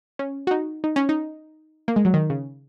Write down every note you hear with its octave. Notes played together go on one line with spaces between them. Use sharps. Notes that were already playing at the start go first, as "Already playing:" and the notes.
C#4
F#4
D#4
D#4
C#4
D#4
A#3
G#3
F#3
D#3
C#3